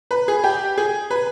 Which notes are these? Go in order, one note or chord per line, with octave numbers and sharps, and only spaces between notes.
B4
G#4
G4
G#4
B4